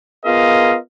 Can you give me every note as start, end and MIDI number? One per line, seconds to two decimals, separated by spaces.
0.24 0.77 59
0.24 0.77 65
0.24 0.77 68
0.24 0.77 70
0.24 0.77 75
0.24 0.77 77